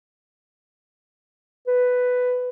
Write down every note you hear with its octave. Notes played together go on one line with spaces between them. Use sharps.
B4